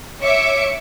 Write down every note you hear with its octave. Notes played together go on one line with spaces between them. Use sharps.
C#5 E5 D6 C#7